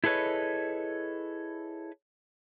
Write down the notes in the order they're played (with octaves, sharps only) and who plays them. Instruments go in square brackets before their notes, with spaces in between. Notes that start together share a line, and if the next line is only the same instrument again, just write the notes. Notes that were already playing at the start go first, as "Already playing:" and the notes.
[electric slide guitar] E4 G#4 A4 B4 C#5 D#5